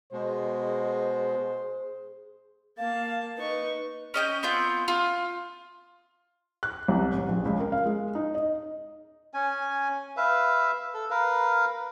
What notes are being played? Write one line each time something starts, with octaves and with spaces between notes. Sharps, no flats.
B2 G#3 G#4 C5
A#3 F5 A5
D#4 B4 C#6
C#4 D#5 G5 G6
B3 C4 F4 G6
F4
F#6
C2
A1
A#1
C#2
A#4
F5
G#3
D#4
D#5
C#4 G#5
B4 E5 F5
A4
A#4 B4 F5